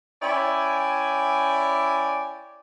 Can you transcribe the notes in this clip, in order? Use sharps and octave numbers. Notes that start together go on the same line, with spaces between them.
C#4 E4 D5 G5 G#5